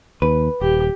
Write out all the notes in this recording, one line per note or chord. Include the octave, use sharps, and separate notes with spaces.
D#2 B4
D#1 G4